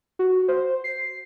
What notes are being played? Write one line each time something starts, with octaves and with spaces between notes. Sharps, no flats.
F#4
C5
C7